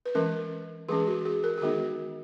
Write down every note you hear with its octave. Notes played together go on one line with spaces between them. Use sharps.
B4
E3 G#3 C#4 A#4
E3 G#3 C#4 G#4
F#4
G#4
A#4
G#4
D#3 G#3 B3 D#4 F#4